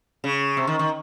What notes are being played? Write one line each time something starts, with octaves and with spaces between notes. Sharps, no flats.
C#3
C3
D#3
D#3